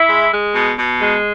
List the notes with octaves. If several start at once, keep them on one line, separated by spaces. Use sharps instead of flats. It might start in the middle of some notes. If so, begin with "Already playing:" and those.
Already playing: E4
G#3
G#3
B2
B2
G#3